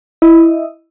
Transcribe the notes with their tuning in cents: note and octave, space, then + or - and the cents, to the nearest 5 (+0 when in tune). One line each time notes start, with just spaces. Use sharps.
E4 +0 D#5 +0